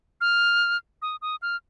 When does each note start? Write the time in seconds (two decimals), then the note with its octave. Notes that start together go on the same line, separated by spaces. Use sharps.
0.21 F6
1.02 D#6
1.22 D#6
1.42 F6